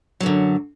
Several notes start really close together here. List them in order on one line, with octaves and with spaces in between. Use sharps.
F#3 F#2 D3